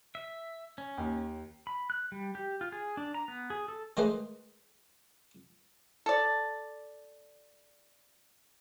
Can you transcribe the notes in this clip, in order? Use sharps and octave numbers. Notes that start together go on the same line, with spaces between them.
E5
C#4
D#2
B5
F#6
G3
G4
F4
G#4
D4
A#5
B3
G#4
A4
D#3 G#3 A3 G#4 B4 C5
A4 D5